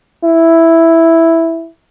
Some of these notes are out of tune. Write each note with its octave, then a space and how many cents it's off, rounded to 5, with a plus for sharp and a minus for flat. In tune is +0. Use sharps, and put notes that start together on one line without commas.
E4 +0